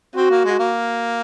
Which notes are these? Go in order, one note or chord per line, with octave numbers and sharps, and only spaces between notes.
C4 F#4
A#3
G#3
A#3